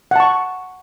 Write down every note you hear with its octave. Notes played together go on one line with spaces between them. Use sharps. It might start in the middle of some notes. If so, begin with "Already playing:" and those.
F#5 A5 C#6